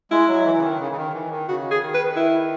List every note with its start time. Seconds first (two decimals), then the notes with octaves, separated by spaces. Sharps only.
0.11 G#3 E4
0.28 F#3
0.45 E3
0.58 C#3
0.62 D#3
0.80 C#3
0.92 C#3
0.97 D#3
1.14 E3
1.31 D#3
1.48 C#3 F#4
1.71 G#4
1.82 D#3
1.94 B4
2.16 E4